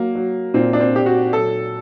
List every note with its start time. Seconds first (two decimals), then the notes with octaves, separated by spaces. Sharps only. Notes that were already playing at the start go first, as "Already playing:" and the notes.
Already playing: F#3 A#3
0.15 F#3
0.54 A#2 C4
0.73 D4
0.80 C4
0.94 A#2 G4
1.06 F#4
1.33 F#3 A4